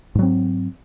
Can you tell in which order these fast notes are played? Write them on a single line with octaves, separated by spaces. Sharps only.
G#2 F#3 C4